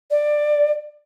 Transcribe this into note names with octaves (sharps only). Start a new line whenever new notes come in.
D5